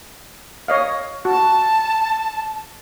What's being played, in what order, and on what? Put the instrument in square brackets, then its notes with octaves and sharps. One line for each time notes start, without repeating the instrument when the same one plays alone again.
[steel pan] C#5 D#5 F5
[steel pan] F#4 [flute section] A5